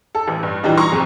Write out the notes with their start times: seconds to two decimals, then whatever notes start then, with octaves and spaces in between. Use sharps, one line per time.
0.15 A4
0.28 A1
0.43 G2
0.63 A#2 E3 G3 D4 D#4
0.77 A#5 C6 C#6
0.92 F2 G#2 C3